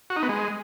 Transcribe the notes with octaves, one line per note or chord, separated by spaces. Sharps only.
F#4
D#4
B3
G#3